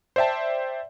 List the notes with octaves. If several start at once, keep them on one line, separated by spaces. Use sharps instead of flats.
C5 D5 E5 G5 A5